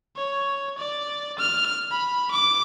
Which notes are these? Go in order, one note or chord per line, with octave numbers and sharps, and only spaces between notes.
C#5
D5
F6
B5
D6